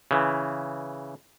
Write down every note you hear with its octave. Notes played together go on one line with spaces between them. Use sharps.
C#3 E3